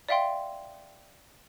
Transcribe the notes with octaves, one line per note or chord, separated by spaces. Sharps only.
D5 E5 F5 G5 C6